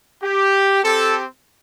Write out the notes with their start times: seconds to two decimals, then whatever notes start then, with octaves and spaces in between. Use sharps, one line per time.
0.23 G4
0.82 C4 G4 A4